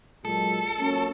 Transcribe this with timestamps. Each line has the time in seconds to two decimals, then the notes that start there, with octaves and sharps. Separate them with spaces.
0.25 A#2 F#3 G#3 A4
0.79 F#3 A#3 C#4